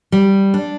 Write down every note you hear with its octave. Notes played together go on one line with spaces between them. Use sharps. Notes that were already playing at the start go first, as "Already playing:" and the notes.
G3
D4